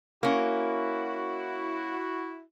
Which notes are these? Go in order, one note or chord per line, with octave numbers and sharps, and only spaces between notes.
A#3 C#4 E4 F#4